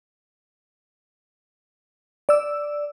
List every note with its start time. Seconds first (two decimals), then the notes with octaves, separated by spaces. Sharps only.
2.29 D5 E6